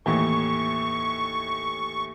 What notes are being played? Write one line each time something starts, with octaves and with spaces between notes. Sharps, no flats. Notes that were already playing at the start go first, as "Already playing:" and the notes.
D#2 A2 E3 C#6